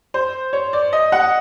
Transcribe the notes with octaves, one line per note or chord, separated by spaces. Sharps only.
C5
C#5
D5
D#5
F#5